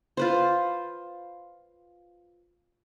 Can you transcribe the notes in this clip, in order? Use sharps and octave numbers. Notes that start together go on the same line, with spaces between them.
F4 B4 C5